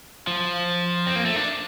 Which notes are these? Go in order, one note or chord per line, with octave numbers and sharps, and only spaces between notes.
F3
C4
A#3
A3
D4